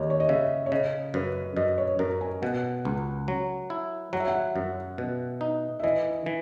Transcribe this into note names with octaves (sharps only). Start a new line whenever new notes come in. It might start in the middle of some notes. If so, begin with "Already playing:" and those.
Already playing: D#2 C#5 D#5
C#5
D#5
C#3 E5
C#5
C#3 D#5
F#2 B4
F#2 D#5
C#5
F#2 A#4
G#5
B2 F#5
C#2
F#3
E4
F#3 F#5
E5
F#5
F#2
B2
D#4
E5
E3 D#5
E3